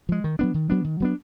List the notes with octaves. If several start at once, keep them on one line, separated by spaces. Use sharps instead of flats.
F3 G#3
D#3
F#3 B3 D4
D#3
F#3 B3 D4
D#3
F#3 B3 D4